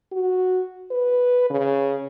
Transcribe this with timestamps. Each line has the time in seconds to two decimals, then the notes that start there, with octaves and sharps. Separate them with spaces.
0.12 F#4
0.91 B4
1.50 C#3